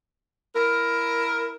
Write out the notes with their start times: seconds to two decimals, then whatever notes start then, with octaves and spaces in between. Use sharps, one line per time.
0.54 E4 A#4